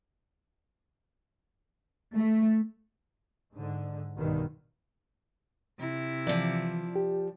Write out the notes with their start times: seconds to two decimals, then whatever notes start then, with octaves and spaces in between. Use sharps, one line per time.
2.15 A3
3.51 G#2 D3
4.16 B1 G2 B2 D3 D#3
5.79 C3 E4
6.27 E3 F3 D5
6.96 G4